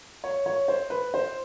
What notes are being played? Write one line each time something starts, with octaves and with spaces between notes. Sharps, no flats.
C#5
C#5
C5
B4
C5